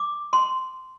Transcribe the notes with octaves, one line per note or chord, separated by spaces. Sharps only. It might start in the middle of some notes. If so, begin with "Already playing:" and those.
Already playing: D6
C6